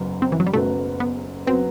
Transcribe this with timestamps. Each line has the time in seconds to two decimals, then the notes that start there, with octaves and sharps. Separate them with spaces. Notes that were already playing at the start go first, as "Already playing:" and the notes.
Already playing: F#1 F#2 F#3 B3
0.22 C4
0.32 E3
0.40 F#3
0.47 G3
0.53 F#1 F#2 F#3 A3 B3
1.00 B3
1.47 F#3 B3 C4